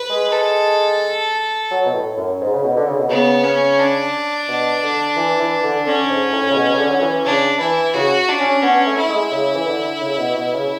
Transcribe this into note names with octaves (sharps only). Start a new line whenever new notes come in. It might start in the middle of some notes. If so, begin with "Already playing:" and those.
Already playing: B4
G#3
A4
F#3
B2
A2
F#2
G#2
C#3
B2
D3
C#3
B2
C#3 B3
C#4
D4
B2
D3
E3
E3
D3
D3 C#4
G#2
A2
C#3
B2
C#3
D3
F#3
E3
C#3 D4
E3 E4
C#3 F#4
D4
C#4
B3 C#4
A3
E4
G#3
C#3
E3
D3
C#3
B2
B2
C#3